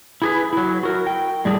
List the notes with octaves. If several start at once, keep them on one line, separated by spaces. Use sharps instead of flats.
E4 G#4 B4
F#3 E4
F#4 A#4
G5
A2 G3 A#3 D4 G#4